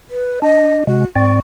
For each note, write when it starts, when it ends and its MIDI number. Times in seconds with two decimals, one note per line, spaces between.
0.10 0.40 71
0.42 0.84 62
0.42 0.83 75
0.87 1.05 48
0.87 1.05 56
0.87 1.05 66
1.16 1.40 44
1.16 1.40 60
1.16 1.40 74
1.16 1.37 85